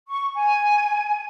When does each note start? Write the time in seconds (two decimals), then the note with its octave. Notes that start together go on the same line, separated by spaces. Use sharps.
0.08 C#6
0.35 G#5